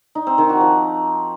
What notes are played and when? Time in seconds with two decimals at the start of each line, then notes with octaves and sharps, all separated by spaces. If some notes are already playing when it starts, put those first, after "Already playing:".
0.15 D#4
0.27 C4
0.38 D#3
0.49 F#4
0.61 F3